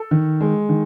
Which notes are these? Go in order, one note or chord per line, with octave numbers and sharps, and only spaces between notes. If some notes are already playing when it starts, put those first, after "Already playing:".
Already playing: A4
D#3
G#3
D#3